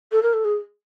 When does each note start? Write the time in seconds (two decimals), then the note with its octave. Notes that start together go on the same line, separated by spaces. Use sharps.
0.12 A4
0.23 A#4
0.34 A4
0.45 G#4